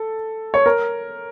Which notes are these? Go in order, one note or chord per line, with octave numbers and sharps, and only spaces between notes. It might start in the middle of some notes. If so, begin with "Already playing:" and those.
Already playing: A4
C#5
A#4